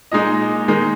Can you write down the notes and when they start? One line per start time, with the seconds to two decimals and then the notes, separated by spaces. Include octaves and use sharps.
0.12 A#2 G#3 D#4 D#5
0.68 D#3 G#3 D#4